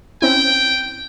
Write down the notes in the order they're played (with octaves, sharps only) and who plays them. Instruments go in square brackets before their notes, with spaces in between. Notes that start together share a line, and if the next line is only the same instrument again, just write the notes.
[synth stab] C4 C#4 E4 [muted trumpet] G5